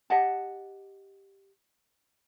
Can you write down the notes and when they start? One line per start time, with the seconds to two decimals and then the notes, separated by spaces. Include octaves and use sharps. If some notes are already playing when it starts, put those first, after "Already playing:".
0.10 G4 D#5 F#5 A5